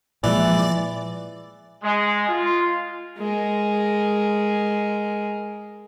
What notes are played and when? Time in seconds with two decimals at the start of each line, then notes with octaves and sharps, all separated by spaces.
0.24 A#2 E3 F3 G#3 D5
1.82 G#3
2.27 F4
3.18 G#3 A#4